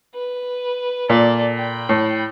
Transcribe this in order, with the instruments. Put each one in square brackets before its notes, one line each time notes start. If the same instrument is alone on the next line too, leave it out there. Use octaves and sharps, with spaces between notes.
[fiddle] B4
[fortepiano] A#2 [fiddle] A4 D5
[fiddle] G5 B5
[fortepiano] A2